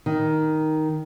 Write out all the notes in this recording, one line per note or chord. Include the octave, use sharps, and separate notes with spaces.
D#3